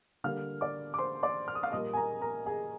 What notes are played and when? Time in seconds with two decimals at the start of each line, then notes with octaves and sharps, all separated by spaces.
0.24 D3 G3 A#3 F5 F6
0.61 D5 D6
0.94 D6
0.99 C5 C6
1.23 D5 D6
1.48 F6
1.55 D#6
1.63 F5 F6
1.72 A#2 G3 A#3 D#5 D#6
1.93 G#5
1.97 A#4 A#5
2.21 A#4 A#5
2.46 G#4 G#5